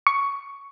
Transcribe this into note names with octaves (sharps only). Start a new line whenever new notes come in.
C#6